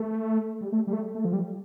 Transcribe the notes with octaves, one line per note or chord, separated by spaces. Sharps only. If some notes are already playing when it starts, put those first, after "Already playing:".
Already playing: A3
G3
A3
G3
A3
A3
F3
G3